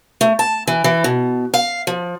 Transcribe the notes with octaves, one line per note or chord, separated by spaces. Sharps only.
A3
A5
E3
E3
B2
F5
F3